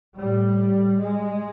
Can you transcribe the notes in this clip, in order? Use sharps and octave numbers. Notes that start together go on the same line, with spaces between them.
A2 G3
G#3